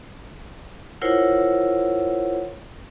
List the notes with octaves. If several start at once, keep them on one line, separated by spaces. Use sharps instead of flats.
E4 F4 A#4 C5 C#5 F#5